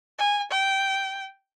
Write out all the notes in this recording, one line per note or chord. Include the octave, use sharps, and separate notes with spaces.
G#5
G5